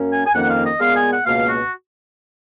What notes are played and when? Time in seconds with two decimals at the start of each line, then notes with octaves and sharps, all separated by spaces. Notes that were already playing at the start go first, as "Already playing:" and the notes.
Already playing: F#2 A#3 C#4
0.12 G#5
0.26 G#5
0.34 F2 D#3 A#3 C#4 F#5
0.50 F5
0.65 D#5
0.79 A#2 G#3 B3 F5
0.95 G#5
1.10 F#5
1.25 C#2 B2 A#3 F5
1.47 F#4